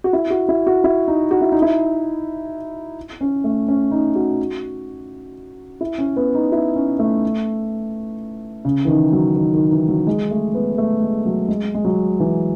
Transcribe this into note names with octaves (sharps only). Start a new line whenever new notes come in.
F#4
E4
F#4
E4
F#4
E4
D#4
F#4
E4
D#4
E4
C#4
A3
C#4
D#4
F#4
E4
C#4
B3
D#4
E4
C#4
A3
C#3
E3
D#3
F#3
D#3
D#3
E3
F#3
G#3
A3
B3
A3
G#3
F#3
G#3
G#3
F#3
E3